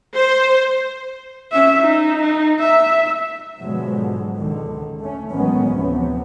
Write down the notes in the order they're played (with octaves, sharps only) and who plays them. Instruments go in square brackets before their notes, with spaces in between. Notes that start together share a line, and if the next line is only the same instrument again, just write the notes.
[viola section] C5
[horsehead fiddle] C#4 E5
D#4
D#4
E5
[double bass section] G#2 B2 D3 F3 F#3 G#3
C#2 D3 D#3
A3 C#4
A1 D#3 F#3 G#3 B3 C#4
D2 C3 E3 F3 B3